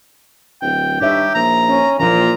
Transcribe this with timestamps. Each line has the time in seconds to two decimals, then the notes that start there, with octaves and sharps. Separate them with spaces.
0.62 D1 G5
1.01 G2 D#4 G4 C#5 E5
1.35 A#1 A#5
1.69 C#4
1.99 A#1 A#2 E3 F3 A#5